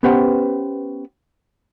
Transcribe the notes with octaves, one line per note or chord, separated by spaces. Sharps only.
B3 C#4 G4 B4 C5 F#5